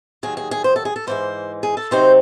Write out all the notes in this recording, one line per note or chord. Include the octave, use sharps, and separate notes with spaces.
D#2 D#3 F#3 G#4
G#4
G#4
C5
A4
G#4
A4
G#2 E3 G#3 C5
G#4
A4
C3 F#3 C4 D#4 C5